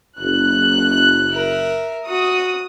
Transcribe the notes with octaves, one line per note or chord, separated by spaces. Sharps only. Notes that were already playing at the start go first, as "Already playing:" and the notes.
F#1 F#6
A#4 E5
F#4 D#6